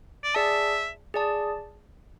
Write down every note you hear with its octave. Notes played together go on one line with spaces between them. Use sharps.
D5
G#4 D5 E5 A5
G#4 D5 A5